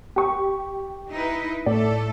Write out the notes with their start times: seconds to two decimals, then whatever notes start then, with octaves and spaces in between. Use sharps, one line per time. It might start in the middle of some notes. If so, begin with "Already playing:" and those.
0.16 G4 C#6
1.12 D#4 E4 B4
1.66 A2 A3 A4 D5